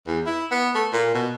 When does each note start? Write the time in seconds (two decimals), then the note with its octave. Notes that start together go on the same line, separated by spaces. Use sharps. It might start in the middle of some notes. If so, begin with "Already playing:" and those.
0.07 E2
0.26 E4
0.51 B3
0.75 A3
0.93 A#2
1.14 B2